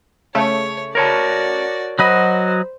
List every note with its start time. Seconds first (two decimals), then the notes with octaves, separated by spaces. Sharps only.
0.35 C#3 A3 C#5
0.95 F#4 A#4 C#5 D5 A5
1.99 F#3 F#4 C5 D#5 B5